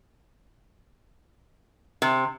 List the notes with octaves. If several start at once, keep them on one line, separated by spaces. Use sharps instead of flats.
C3